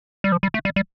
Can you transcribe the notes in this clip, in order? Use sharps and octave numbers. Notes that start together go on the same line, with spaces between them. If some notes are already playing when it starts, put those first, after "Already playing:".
G3
F3
G3
A3
G3
G3